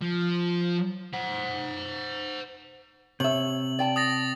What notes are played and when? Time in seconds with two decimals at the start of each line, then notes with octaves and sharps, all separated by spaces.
0.02 F3
1.13 C5 F#5
3.20 C3 C#5 E5 F#7
3.79 D5 G5 A5
3.96 D#6 A6 A#6